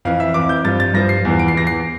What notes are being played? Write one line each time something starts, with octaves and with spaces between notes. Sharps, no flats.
F2 E3 F5
E5
F2 E3 D6
G6
G2 F3 A6
A6
G2 F3 A#6
C7
E2 E3
D7
C7
E2 E3 A#6
C7